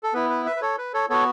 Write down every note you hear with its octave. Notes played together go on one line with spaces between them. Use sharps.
A4
B3 E4 B4
B4
B4 E5
B4
A4 C#5
B4
A4 C#5
B3 F#4 A4 C#5